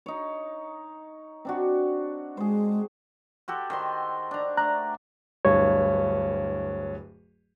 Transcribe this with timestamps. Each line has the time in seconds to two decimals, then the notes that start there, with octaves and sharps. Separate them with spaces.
0.06 D#4 C#5
1.45 C4 D4 F#4
2.37 G#3 G#4 C5
3.48 F#4 G4 A4
3.70 D#3 C5 C6
4.31 D4 A#5
4.57 A3 D4 A#5 F#6
5.45 D1 G2 C#5